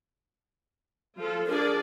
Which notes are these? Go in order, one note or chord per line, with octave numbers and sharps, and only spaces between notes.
F3 F4 A4
D4 G#4 A#4 D5